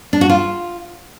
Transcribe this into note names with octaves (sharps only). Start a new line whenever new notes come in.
D4
F#4
F4